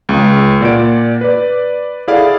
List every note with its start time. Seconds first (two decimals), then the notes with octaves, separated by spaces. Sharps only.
0.09 C#2 C#3
0.61 A#2 D5 F#5 D7
1.21 B4 D5
2.08 E4 G#4 A4 D5 F5 F#5